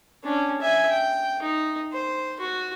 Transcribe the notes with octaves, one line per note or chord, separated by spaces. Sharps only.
C#4 D4
E5 G#5
G5
D#4
C5
F#4